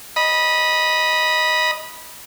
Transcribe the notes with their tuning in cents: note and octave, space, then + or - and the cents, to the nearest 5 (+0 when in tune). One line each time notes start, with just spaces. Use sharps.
D#5 +0 B5 -20